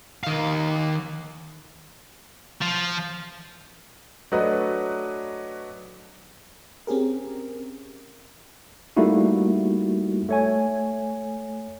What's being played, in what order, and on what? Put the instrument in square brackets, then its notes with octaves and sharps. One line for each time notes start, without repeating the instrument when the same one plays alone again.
[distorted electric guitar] D#3 F5
F3
[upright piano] F#3 A3 D4 F#4 B4 D#5
[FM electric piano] C4 C#4 G4 G#4 A#4
[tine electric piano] G3 A3 A#3 D#4 E4 F#4
A3 C#5 G#5